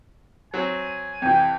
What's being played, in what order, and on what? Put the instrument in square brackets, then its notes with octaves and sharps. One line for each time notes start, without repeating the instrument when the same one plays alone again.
[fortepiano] F#3 C4 [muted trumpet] G#5
[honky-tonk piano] F2 C3 E3 [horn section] G5